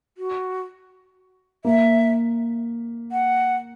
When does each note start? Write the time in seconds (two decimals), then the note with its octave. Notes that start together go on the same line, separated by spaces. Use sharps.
0.18 F#4
1.65 A#3 E5
3.12 F#5